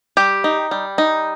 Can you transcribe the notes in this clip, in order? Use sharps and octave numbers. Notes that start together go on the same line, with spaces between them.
G3 G4
D#4
G3
D#4